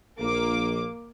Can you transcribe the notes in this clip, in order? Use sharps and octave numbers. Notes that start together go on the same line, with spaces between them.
A#1 A#3 D6